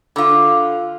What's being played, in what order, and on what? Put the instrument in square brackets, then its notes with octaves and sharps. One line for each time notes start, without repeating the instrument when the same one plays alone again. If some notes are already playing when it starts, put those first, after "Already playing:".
[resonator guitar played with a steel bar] D3 F4